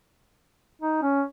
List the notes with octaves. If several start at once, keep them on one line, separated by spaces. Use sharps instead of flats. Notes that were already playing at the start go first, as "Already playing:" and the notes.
D#4
C#4